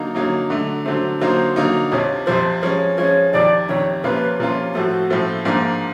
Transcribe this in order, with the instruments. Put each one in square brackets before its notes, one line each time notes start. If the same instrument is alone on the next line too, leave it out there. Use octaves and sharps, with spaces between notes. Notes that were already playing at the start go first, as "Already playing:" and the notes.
Already playing: [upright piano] D3 F#3 A#3 D#4
[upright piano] D3 F#3 A#3 D#4 [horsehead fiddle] C#5
[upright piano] D3 F#3 A3
[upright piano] D3 F#3 A3 [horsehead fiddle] C5
[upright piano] D3 F#3 A#3 D#4 [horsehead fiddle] C5
[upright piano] D3 F#3 A#3 D#4
[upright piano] F2 C3 F3 [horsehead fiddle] C#5
[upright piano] F2 C3 F3 [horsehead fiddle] C5
[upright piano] F3 G#3 C#4 [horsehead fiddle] C#5
[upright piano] F3 G#3 C#4 [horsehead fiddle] C#5
[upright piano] F2 C3 D#3 [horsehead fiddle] D5
[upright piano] F2 C3 D#3 [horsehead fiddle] C#5
[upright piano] C3 F3 A#3 C#4 F4 [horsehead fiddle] B4
[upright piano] C3 F3 A#3 C#4 F4
[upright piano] A2 F3 A3 [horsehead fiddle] F#4
[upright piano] A2 F3 A3
G#2 F3 A#3 D4